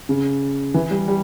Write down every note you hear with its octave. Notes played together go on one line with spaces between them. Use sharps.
C#3
E3
G3
G3